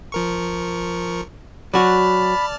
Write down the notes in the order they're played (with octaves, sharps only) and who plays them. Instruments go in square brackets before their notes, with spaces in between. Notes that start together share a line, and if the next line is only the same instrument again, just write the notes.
[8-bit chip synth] F3 A#4 C#6
[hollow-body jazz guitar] F#3 F#4 [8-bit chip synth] D5 A5 F6 [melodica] B5